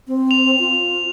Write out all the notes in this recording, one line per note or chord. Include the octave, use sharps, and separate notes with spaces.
C4
F7
F4